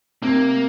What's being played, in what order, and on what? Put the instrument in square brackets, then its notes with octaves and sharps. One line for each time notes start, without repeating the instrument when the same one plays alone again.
[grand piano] C3 [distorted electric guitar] A#3